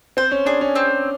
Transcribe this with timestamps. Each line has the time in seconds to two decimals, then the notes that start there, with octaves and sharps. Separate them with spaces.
0.17 C4 C5
0.32 C#4
0.46 D4 G#4
0.61 C#4
0.76 C4